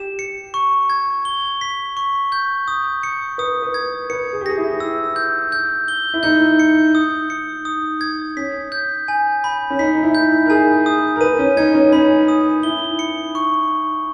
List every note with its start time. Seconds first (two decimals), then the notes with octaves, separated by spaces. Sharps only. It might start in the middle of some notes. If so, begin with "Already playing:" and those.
Already playing: G4 E7
0.19 C#7
0.54 C#6
0.90 G#6
1.25 G7
1.61 B6
1.97 C#6
2.32 G6
2.68 D#6
3.03 C#7
3.38 B4 D#6
3.62 B4
3.74 G#6
4.10 B4 C#7
4.33 G#4
4.41 G4
4.46 G#4 A#6
4.57 E4
4.80 E6
5.16 G6
5.52 G6
5.88 G7
6.14 E4
6.23 D#4 G6
6.59 C#7
6.95 D#6
7.30 C#7
7.65 D#6
8.01 G#6
8.37 C#4 B6
8.72 G6
9.08 G#5
9.44 B5
9.70 C#4
9.79 D#4 B6
9.95 D#4
10.03 E4
10.15 G6
10.46 A#4
10.50 G#4 G#5
10.86 D#6
11.16 A#4
11.21 B4 D#7
11.39 C#4
11.57 D#4 G#6
11.74 C#4
11.92 C#4 B5
12.28 D#6
12.63 E4 G7
12.99 C#7
13.35 C#6